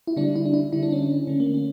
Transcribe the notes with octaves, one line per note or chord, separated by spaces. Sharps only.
E4
D3 G3 D4
E4
D4
E4
D3 G3 E4
D4
C#4
D4
D3 A3 C#4
A#3
C#4